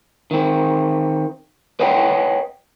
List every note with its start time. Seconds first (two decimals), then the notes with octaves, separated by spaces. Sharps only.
0.31 D#3 C4
1.80 B4 C#5 D#5 F#5 G5